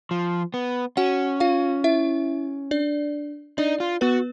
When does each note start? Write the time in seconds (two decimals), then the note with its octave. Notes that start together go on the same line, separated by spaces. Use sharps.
0.11 F3
0.54 B3
0.97 C#4 F#4 F#5
1.40 F4 F5
1.84 E4 E5
2.71 D4 D5
3.58 D4 D#4 D5
3.80 F4
4.01 B3 F#4 B4